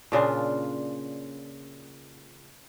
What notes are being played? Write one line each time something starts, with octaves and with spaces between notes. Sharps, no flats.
A#2 C#3 D4 F4